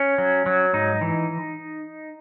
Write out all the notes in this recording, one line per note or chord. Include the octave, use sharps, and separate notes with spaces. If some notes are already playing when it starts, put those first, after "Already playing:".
Already playing: C#4
F#3
F#3
G#2 D#4
E3